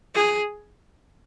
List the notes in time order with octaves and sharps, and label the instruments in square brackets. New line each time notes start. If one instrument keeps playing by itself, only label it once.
[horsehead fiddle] G#4